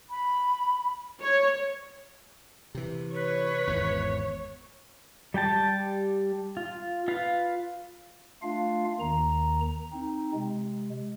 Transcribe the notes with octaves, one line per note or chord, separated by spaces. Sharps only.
B5
C#5
C3 E3
B4 C#5
G#1 E2
G3 G4 G5 A5
F4
F4 B4 F5
A3 D4 F4 F5
D#2 D#3 A#5
C4 D#4
C3 G#3